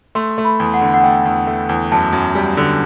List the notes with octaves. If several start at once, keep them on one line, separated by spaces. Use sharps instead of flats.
A3 C6
A3
B5
E2
F#5
D3
F#5
A3 G5
E2
A3
E2
F#2 A5
F#2
G3
D3